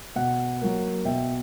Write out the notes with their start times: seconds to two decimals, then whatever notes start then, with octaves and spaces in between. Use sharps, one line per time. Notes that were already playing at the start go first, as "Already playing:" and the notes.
0.16 B2 F#5
0.61 F#3 A#3
1.05 B2 E5 G5